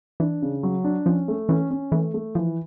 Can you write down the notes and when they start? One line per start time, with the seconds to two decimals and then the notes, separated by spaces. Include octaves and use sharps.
0.20 E3 D4
0.42 C#3
0.63 F#3
0.84 D4
1.06 F3 C#4
1.28 A3
1.49 E3 C#4
1.71 C#4
1.91 E3 A3
2.14 A3
2.35 E3 F3